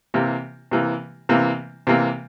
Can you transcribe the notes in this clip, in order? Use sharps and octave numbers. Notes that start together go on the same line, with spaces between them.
C3 E3 A#3
C3 E3 A#3
C3 E3 A#3
C3 E3 A#3